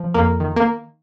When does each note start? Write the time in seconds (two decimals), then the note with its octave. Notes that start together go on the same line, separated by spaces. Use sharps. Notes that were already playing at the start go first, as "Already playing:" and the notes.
Already playing: F3
0.14 F2 A#3
0.40 D#3
0.56 A#3